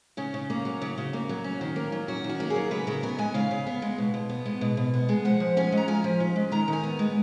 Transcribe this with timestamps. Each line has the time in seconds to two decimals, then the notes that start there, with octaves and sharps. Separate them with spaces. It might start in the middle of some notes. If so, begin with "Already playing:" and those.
0.17 C#3 C#4
0.34 C#3
0.50 A#3
0.65 F#3
0.82 C#3
0.98 C#3
1.13 A#3
1.29 F#3
1.44 C#4
1.61 D#3
1.76 A#3
1.92 F#3
2.08 C#4 F#4
2.24 D#3
2.29 F#4
2.40 A#3
2.50 G#4
2.56 F#3
2.71 C#3 B4
2.87 C#3 A#4
3.03 B3 G#5
3.18 G#3 G#5
3.34 C#3 F5
3.51 C#3
3.66 B3
3.82 G#3
3.98 B2
4.14 B2
4.29 B3
4.45 G#3
4.61 B2
4.77 B2
4.94 B3
5.09 G#3
5.25 F3 F#5
5.40 F3
5.57 C#4 G#5
5.72 G#3
5.77 A#5
5.88 F3 G#5
6.04 F3
6.20 C#4
6.36 G#3
6.52 D#3 A#5
6.68 D#3 G#5
6.83 B3
6.99 G#3